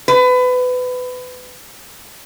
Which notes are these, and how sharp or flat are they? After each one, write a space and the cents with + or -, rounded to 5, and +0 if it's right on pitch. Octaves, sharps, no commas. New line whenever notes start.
B4 +25